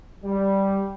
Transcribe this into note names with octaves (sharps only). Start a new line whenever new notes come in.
G3